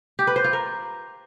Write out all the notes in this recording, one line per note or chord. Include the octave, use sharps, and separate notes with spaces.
G4
B4
C5
F4
A#4